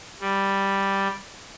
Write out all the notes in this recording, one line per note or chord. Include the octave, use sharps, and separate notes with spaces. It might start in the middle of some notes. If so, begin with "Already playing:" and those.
G3